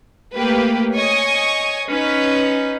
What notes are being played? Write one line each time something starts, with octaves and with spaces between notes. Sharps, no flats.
A3 A#3 G4 B4
C#5 D#5 G#5 C#6 D#6
C#4 D#4 B4